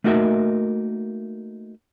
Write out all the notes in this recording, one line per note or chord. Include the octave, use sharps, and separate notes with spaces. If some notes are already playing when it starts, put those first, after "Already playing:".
A3 A#3 D#4 F#4 A#4 E5